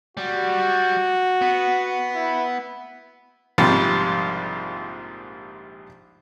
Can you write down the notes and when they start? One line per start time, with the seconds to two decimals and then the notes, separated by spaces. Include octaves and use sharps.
0.17 G3 F#4
1.42 B3
2.15 E4
3.58 A#1 G#2 C3 F3 G3